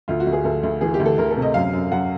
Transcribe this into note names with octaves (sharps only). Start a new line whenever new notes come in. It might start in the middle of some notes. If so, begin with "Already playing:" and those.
D2 F4
F#4
D2
G#4
D2 A4
D2
E3 G#4
G4
D2
A4
D2 A#4
A4
C3
D#5
F#2 F5
F#2
F#2 F#5